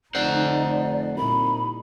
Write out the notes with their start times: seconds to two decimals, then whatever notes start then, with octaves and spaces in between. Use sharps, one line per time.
0.15 F1 D3 D#4 C5 D5 F#5
1.17 C2 A#2 D#4 B5